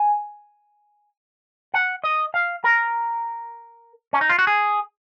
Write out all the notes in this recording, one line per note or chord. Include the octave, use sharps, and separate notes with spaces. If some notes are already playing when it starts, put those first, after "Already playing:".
Already playing: G#5
F#5
D#5
F5
A#4
C#4
D#4
F4
F#4
G#4